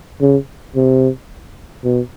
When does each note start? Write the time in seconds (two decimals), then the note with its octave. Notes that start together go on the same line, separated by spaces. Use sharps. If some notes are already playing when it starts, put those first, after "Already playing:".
0.21 C#3
0.76 C3
1.84 B2